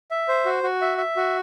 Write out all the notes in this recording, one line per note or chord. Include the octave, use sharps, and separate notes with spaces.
E5
C5
F#4
F#4
E5
E5
F#4